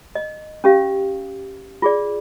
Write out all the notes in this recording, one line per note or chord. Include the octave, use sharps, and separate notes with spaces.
D#5
C#4 G4 F5
F4 G#4 D5